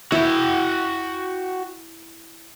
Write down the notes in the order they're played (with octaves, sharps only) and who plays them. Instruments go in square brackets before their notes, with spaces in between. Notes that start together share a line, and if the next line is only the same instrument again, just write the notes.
[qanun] E4 [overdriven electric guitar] F#4 G5